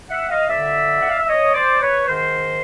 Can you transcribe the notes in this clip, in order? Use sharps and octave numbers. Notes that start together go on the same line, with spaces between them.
E5 F#5
D#5 F5
F2 D3 D5 E5
F#5
F5
E5
C#5 D#5
C5 D5
B4 C#5
G#2 D#3 A#4 C5